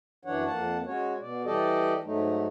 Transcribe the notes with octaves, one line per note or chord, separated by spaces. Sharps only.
F#2 E3 F#3 D4 C#5 F#5
F2 A#3 F#5 A5
G#3 C#4 F#4 C#5
B2 D5
E3 G3 G4 A4 D5 D#5
G#2 F#3 A3 D#4